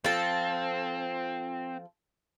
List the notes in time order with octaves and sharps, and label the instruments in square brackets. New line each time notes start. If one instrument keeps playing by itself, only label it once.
[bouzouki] F3 A4 [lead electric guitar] C4